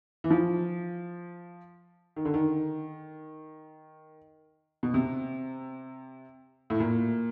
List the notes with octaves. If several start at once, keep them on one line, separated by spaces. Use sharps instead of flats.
E3
F3
D#3
D3
D#3
B2
C3
A2
A#2